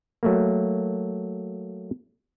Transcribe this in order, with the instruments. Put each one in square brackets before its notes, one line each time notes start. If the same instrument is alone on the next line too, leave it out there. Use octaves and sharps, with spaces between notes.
[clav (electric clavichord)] F#3 A3 A#3